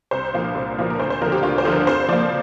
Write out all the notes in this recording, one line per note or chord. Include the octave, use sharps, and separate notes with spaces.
C2 C5
A#2 F3 A#3
C2
A#2 F3 A#3
A#4
D2 C5
C5
D3 F3 A#4
G4
D2 F4
C5
D3 F3
A#4
F2 C5
F3 A#3 D5